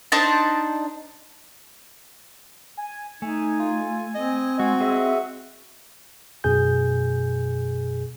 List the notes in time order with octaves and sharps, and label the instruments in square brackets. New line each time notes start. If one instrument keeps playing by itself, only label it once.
[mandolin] D4 D#4 C5 A5
[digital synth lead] G#5
[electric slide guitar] A3 [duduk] D#4 [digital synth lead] G#5
[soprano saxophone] F4
[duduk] C4 [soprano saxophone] D#5
[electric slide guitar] G#3 [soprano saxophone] F#4
[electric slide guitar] G#4 D#5 [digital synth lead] E5
[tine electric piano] F#2 B2 G#4 G#5 G6